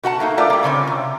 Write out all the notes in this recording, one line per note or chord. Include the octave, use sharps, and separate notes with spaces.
B2 F#4 F#5 A5
A3 A#3 D#4
A3 F4 A#4 D5
G3 A#3
A#2 C#3 C4 C#4
C3